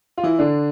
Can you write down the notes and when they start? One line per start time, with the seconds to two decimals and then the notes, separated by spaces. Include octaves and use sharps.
0.18 F4
0.23 E3 E4
0.39 D3 D4